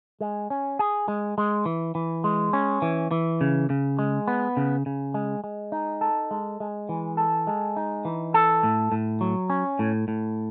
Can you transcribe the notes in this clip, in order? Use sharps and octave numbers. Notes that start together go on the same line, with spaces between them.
G#3
C#4
G#4
G#3
G#3
E3
E3
G#3
C#4
E3
E3
C#3
C#3
G#3
B3
C#3
C#3
G#3
G#3
D#4
A4
G#3
G#3
E3
A4
G#3
D#4
E3
A4
A2
A2
F#3
C#4
A2
A2